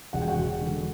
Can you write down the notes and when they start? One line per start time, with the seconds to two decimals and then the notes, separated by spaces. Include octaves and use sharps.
0.13 E1 F#5
0.22 G5
0.28 F#4 F#5
0.38 E1
0.62 D3